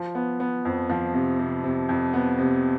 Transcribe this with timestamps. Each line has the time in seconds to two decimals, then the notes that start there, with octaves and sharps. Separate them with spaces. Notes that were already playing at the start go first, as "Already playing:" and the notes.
Already playing: F3
0.15 B3
0.40 B3
0.65 F2
0.90 F3
1.14 C3
1.39 C3
1.64 C3
1.89 F2
2.14 B3
2.39 C3